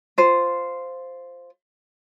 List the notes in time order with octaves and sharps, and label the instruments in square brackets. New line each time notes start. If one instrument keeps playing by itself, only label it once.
[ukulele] F4 C5